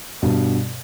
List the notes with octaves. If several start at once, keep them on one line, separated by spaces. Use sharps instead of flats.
G2 B2